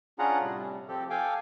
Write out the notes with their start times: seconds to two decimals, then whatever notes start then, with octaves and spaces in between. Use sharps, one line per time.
0.19 C#4 D4 F4 G#4 F#5 A#5
0.42 A2 C3 G3
0.88 F3 C4 G4 A4
1.10 A4 F5 G5 G#5 D6